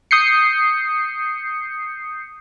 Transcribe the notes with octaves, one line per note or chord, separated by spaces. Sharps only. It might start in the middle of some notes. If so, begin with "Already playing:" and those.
D#6 G6 C7 C#7